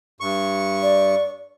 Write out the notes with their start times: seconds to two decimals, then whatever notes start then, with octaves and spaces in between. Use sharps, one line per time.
0.21 G2 C#6
0.83 D5